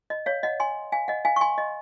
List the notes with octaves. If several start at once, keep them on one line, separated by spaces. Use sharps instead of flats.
D#5
C#5 F5
D#5 F#5
G#5 C6
F5 G#5
D#5 F#5
F5 G#5
C#6
G#5 C6
D#5